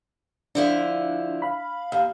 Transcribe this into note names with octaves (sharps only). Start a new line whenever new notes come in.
D3 F3 D4 E4
F5 B5
D#2 F5